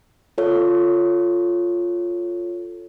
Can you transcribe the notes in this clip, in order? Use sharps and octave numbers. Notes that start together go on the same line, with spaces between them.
F4 A4 C#5